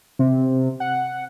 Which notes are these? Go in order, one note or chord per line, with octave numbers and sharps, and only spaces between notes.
C3
F#5